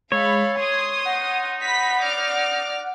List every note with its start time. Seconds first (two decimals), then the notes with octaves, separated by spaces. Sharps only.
0.12 G#3 A4 C#5 F5 B5
0.57 G#4 C6 D#6 G#6
1.05 D#4 F#5
1.61 B5 B6
2.00 D5 D6 F6